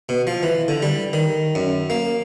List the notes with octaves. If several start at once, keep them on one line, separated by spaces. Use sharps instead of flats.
B2
F3
E3
D3
G3
D#3
F#2
A#3